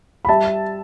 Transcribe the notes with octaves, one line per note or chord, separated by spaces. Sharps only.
B5
G3 E5 A5